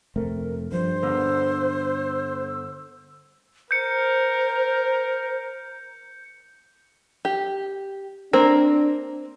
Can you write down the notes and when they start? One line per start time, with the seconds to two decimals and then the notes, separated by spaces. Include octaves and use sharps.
0.16 F1 A3 C4 A#4
0.72 G2 F3 C5
1.03 D3 A#3 B3 E6
3.71 A#4 C5 G6 C#7
7.25 G4
8.33 A#3 C4 D4 A#4